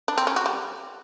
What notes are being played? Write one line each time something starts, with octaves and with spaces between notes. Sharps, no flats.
D4
C4
C#4
F#4
G3